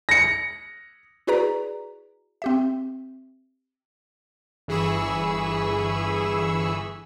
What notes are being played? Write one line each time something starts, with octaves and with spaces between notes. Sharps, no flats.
A#6 C#7
E4 F#4 G#4 B4 D5 A#5
C4 G4 E5
G1 E3 G#4 B5 C#6 E6